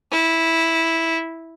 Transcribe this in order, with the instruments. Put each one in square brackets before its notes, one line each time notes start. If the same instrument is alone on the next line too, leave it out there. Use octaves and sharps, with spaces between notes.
[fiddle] E4